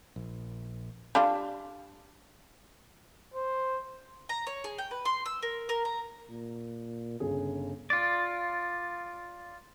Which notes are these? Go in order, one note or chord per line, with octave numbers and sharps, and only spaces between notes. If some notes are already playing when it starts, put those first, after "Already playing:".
A#1
G3 D4 F4
C5
A#5
C#5
G#4
G5
B4
C6
E6
A#4
A#4
A#5
A#2
G1 C#3 G#4
F4 D5